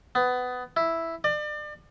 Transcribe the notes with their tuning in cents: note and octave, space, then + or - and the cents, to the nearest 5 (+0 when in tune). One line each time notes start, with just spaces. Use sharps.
B3 +20
E4 +0
D5 +35